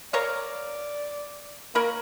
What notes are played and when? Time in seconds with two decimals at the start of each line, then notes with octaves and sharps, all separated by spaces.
0.13 A#4 C#5 D5 F5
1.75 A#3 A#4 C#5 B5